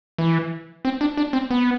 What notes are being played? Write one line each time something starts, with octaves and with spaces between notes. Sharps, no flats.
E3
C4
D4
D4
C4
B3